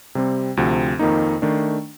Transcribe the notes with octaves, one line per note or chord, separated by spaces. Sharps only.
C3 G3 C4
D2 C3 F3 C4
F2 D#3 A#3 D#4
D#3 A3 D4